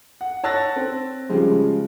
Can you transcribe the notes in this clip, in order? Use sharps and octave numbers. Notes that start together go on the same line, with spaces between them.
F#5
C#5 A5 E6 F#6 A6 A#6
C4
C#3 F3 G3 G#3